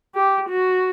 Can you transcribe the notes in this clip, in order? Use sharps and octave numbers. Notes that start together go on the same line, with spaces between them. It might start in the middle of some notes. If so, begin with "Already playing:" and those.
G4
F#4